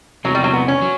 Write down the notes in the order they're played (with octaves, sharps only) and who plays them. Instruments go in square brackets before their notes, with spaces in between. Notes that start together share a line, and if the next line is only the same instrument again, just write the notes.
[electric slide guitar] E2 C3 E3 [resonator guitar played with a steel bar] F#3
[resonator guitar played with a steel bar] G3
F#3
B3
C#4
[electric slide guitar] F#3